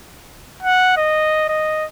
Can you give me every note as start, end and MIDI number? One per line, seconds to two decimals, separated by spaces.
0.62 0.95 78
0.97 1.45 75
1.49 1.86 75